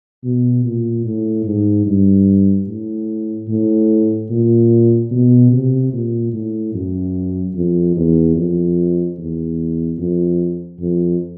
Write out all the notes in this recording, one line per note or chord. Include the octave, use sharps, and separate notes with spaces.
B2
A#2
A2
G#2
G2
A2
A2
A#2
B2
C3
A#2
A2
F#2
F2
E2
F2
E2
F2
F2